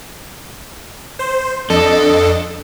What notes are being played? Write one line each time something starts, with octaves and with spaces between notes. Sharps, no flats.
C5
F2 D4 A4 D#5